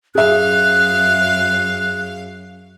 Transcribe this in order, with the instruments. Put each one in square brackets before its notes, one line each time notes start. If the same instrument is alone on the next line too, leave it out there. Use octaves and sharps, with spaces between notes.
[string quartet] F#2 F5 [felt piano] G#4 E5 [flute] F#6